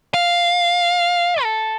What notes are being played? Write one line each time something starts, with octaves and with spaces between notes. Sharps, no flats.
F5
A4